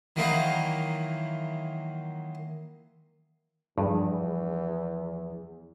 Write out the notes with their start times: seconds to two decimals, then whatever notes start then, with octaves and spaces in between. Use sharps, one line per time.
0.16 D#3 E3 F#3 A#3 D#4 F4
3.78 E2 G2 F3 G#4